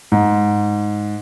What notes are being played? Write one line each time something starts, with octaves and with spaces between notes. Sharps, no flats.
G#2